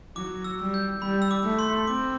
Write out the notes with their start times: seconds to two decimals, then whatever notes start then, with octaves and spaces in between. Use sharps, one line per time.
0.16 F#3 D6
0.44 E6
0.60 G3
0.74 G6
1.02 G3 B5
1.22 E6
1.31 D6
1.44 A3
1.59 C6
1.87 C4 D6